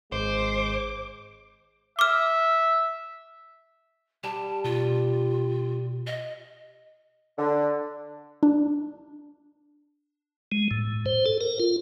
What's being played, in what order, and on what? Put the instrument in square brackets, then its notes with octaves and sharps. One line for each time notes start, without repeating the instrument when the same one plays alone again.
[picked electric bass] G#1 [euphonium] G#3 [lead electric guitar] C5 [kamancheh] D6
[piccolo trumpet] E5 [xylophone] D6 F6
[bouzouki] G3 G4 [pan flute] A5
[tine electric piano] B2 [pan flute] F4
[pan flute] D#5
[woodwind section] D3
[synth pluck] D4
[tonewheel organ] G#3
A2
C5
A4
A#4
F4